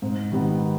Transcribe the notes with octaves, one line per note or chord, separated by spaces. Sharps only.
G#2
D#3 G3 B3